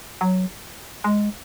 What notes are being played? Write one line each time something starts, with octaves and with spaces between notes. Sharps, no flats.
F#3
G#3